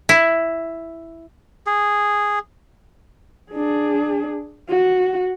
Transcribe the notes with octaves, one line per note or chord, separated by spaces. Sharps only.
E4
G#4
D4 G#4
F#4